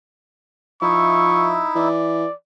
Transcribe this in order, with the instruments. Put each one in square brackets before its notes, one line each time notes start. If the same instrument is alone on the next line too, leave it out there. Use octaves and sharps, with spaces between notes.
[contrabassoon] F3 [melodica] D#4 E4 E5 [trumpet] C#6
[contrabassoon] E3 [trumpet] D5